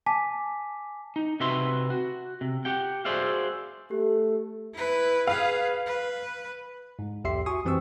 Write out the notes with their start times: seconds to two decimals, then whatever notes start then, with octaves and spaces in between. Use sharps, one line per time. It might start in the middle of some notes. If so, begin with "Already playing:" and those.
0.06 G#5 A5 D6 B6
1.16 D#4
1.40 C3 F#4 B4 E5 C6
1.90 F#4
2.41 C3
2.65 G4 F#5 G5
3.05 F#4 G#4 C5 D5 E5 F5
3.91 A3 G4 A4
4.73 E4 B4
5.27 G#4 B4 F5
5.86 B4
6.99 G#2
7.24 B1 E2 G4 E5 C6 C7
7.46 F#4 G#5 C#6 D#6
7.65 F#2 E3 C4 G4 C#6 E6